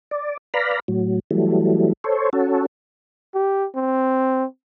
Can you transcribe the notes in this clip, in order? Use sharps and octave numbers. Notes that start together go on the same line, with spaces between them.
D5
B4 D5 F5 A#5 B5
A2 F#3
E3 F#3 G3 A3
A4 C5 C#5
C#4 F#4 A4
G4
C4